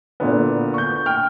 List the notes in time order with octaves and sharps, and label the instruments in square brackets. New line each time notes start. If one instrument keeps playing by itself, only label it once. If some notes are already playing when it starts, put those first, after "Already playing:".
[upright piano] A#2 D3 B3
C#6 G6
G5 F6